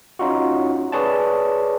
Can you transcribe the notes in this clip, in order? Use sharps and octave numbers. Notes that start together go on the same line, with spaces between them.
C#4 D#4 F4 F#4
G#4 B4 C#5 D5 G#5 A5